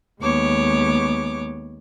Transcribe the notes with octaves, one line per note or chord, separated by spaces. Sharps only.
D#2 G#3 B3 C#5 D6